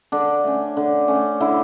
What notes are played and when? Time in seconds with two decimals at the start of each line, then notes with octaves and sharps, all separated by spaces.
0.12 D3 D4
0.44 A3 C#4
0.77 D3
1.08 A3 C#4
1.40 D3 E4